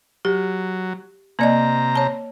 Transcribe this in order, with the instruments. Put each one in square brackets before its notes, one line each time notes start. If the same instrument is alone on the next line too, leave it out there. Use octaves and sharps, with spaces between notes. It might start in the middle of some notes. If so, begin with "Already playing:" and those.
[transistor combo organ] F#3 [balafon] G4
[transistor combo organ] C3 A#5 [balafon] A#3 D5 D#5
[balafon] C#5 A5